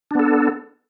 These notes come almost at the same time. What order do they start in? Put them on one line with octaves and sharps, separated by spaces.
D4 B3 A4